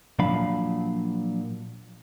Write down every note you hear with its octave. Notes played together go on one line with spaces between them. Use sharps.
A#2 F3 F#3 D4 F5 B5